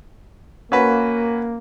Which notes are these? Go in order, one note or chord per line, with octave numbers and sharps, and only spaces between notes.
A#3 C#4 F#4 B4